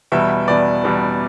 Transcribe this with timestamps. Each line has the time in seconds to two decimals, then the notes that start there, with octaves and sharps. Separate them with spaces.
0.12 E2 B2 G3 B3 E5
0.48 E2 B2 G3 B3 D5
0.84 E2 B2 G3 B3